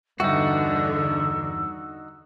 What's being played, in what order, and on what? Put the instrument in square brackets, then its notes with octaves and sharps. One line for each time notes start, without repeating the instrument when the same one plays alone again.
[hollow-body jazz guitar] E2 G2 [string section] D3 [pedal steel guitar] D#4 F#4 [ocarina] E6